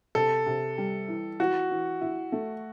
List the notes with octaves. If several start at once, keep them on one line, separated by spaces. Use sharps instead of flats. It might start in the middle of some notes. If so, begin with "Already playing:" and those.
C3 A4
C3
G3
E3
E3 F#4
E3
E4
A3